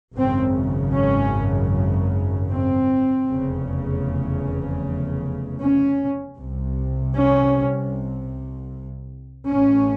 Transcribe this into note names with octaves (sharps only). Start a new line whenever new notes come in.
G#1 F#2 C#3 C4
C#4
C4
F1 E2 C#3
C#4
C2 C3
C#4
A1 A2 C#4